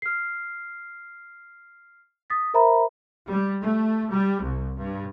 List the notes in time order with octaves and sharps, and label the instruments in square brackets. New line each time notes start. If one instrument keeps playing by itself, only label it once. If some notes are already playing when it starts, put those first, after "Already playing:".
[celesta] F6 C7
D#6 A6 B6
A#4 C5 E5 A#5 B5
[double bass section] G3
A3
G3
C2
G2